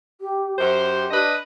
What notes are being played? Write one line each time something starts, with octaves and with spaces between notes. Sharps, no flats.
G4
F#2 G4 C5
D4 B4 D#5